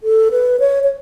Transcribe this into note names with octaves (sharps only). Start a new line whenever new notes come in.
A4
B4
C#5
C#5